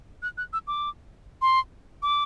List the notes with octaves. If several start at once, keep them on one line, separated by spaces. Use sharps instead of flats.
F#6
F#6
E6
D6
C6
D6